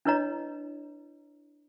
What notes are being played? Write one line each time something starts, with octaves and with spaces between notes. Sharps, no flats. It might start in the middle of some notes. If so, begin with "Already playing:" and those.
D4 E4 B4 C#5 D#5 A#5